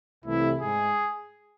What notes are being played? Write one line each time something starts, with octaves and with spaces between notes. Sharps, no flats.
C2 C3 E3 A3 E4
G#2 G#4